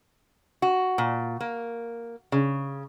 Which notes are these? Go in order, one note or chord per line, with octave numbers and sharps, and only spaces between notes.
F#4
A#2
A#3
C#3